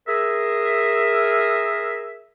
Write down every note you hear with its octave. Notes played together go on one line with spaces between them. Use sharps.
G#4 A#4 E5